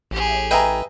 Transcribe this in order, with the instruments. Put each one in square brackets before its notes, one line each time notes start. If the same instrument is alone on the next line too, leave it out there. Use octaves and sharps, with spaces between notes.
[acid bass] A1 [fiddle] G4 G#4
[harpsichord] B4 D#5 E5 [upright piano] G5 G#5 A#5